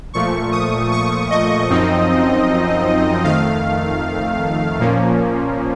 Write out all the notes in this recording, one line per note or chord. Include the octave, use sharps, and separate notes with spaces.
A#2 F3 A3 C#6
D#6
C#6
D#5
F#2 F3 C4 D#4
F2 D#3 A3 F5
A#2 F3 A#3 C#4